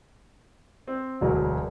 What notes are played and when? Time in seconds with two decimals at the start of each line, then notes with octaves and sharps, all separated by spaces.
0.87 C4
1.21 E1 D2 F#3 G#4 A#4